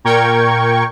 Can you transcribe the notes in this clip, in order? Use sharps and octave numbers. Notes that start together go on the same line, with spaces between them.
A#2 A#4 G5 C#6 G#6